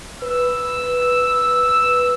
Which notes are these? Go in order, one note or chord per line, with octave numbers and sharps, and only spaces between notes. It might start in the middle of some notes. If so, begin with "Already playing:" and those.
B4 E6